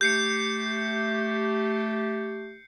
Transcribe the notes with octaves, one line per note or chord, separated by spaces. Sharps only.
A3 G4 G6 C7 C#7